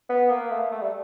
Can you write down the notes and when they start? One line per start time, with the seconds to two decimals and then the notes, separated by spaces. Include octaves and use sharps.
0.09 B3
0.30 A#3
0.51 A3
0.71 A3
0.82 G3